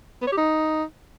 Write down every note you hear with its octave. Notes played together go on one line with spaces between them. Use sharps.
B3
C#5
G4
D#4